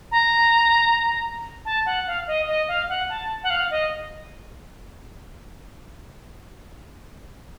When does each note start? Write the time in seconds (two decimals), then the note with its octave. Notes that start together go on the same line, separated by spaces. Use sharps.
0.12 A#5
1.65 A5
1.86 F#5
2.07 F5
2.27 D#5
2.48 D#5
2.68 F5
2.89 F#5
3.10 A5
3.43 F#5
3.50 F5
3.71 D#5